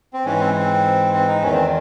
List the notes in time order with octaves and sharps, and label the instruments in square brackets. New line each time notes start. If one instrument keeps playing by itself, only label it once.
[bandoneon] C4
G#2 E3 C#4
C4
C4
C4
D#4
E2 D#3 C#4
C4